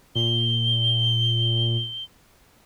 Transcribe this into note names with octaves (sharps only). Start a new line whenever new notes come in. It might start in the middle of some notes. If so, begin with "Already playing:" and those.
A#2 G7